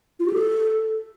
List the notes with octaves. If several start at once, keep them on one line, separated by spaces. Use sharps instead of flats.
F4
G4
A4